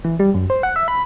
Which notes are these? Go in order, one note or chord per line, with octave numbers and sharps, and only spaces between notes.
E3
G3
F#2
C5
F#5
E5
B5